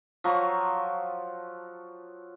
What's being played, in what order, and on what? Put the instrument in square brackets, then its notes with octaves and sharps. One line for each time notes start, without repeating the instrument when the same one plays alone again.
[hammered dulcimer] F3 F#3 A#5 C#6